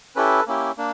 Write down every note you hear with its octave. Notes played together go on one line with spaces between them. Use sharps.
C#4 E4 G4 A4 B4
A#3 C#4 E4 G4
A#3 D4